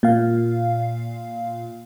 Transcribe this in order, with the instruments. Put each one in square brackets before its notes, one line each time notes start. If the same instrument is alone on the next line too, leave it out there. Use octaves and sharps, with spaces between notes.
[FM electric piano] A#2 F5